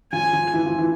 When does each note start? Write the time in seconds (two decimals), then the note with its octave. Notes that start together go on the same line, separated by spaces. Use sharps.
0.12 F3 G#5
0.33 F3
0.54 E3
0.66 F3
0.78 E3